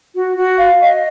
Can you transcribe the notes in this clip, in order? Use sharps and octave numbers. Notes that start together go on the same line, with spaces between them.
F#4
F#4
F5
D#5